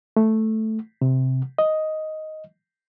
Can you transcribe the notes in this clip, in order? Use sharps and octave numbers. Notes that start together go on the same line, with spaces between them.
A3
C3
D#5